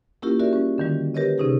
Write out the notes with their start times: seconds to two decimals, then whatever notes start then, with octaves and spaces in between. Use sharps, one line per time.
0.22 A#3 C#4 E4 F4 G4 A#4
0.39 F#4 G4 A#4 D5 E5
0.53 G3 C#4
0.78 D3 D#3 G3
1.14 G4 A#4 B4 C#5 D#5
1.38 C3 C#4 D#4 G4 G#4